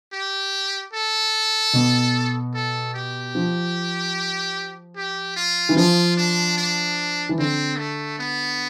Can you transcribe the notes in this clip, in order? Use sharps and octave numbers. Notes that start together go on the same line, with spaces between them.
G4
A4
B2
A4
G4
F3
G4
F4
E3
F3 F4
D4
D4
E3
D3 C4
A3
B3